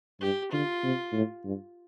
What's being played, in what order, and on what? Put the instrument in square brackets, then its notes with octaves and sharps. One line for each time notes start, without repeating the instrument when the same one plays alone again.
[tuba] G2 [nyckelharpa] G4
[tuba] D3 [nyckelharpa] F4
[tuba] C3
A2
G2